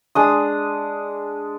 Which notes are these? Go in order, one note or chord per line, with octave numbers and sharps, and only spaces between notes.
G#3 D4 D#6